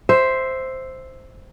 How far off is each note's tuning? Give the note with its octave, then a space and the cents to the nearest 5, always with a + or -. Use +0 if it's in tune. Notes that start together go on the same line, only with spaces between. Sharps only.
C5 +0 E5 +0